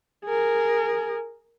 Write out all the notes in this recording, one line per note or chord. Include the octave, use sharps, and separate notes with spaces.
G#4 A#4